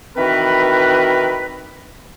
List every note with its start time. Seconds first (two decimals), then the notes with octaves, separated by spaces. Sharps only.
0.16 D#3 E3 C4 F#4 A#4 B4